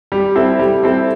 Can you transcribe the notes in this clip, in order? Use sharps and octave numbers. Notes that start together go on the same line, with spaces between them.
G3
C4 E4 A4
G3
C4 E4 A4